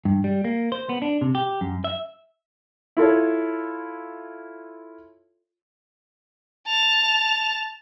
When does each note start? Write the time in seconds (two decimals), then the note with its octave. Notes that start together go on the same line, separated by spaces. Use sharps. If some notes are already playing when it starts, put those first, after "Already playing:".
0.05 G2
0.24 G3
0.44 A#3
0.72 C5
0.89 B3
1.02 D4
1.21 C3
1.35 G4
1.61 F#2
1.84 E5
2.97 E4 F4 A4 C#5
6.67 A5 F7